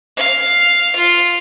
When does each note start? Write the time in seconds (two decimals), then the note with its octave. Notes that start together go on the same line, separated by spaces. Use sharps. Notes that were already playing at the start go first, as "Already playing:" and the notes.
0.17 F5
0.96 F4